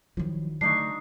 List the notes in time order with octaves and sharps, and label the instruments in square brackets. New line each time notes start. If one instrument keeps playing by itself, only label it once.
[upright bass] D#3 E4 [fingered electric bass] F3 F#3
[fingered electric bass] D3 F#3 A3 [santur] D4 D#4 C#6 [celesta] C7